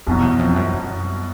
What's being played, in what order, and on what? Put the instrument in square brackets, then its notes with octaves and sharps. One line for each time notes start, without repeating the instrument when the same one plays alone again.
[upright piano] C2 B2 F#3 [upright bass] F2
[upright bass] E2
F2
F#2
F#2